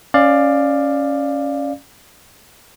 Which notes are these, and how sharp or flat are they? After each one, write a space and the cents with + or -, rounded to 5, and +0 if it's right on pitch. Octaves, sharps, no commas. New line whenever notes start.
C#4 +0 D5 +15 F5 +0